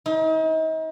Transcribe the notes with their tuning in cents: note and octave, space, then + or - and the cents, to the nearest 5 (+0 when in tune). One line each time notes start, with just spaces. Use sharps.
D#4 +40